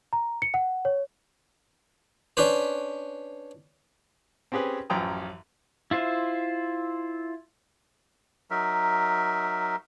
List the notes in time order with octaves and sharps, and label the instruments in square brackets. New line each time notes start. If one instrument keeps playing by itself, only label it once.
[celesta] A#5
C#7
F#5
C#5
[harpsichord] C#4 D4 B4 C5
[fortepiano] C4 C#4 G4 G#4 B4
A1 F#2 F3 G5 A#5 D#6
[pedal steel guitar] E4 F4 C5 E5
[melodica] F#3 D#4 A#4 E5